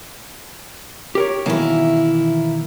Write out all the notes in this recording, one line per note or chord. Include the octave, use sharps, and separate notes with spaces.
G4 A#4 C#5
B2 D#3 E3 A#3 E4